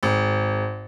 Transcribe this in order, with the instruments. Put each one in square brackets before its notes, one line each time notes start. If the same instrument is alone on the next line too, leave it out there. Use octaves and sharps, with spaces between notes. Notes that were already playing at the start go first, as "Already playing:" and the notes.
[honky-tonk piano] G#1